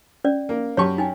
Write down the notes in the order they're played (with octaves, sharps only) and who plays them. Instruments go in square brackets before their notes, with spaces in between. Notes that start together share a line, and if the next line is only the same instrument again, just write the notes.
[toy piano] C#4 D5
[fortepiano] A#3
[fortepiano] F#2 G4 C#6 [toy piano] C#5 A5
[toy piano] D#4 G5 G#5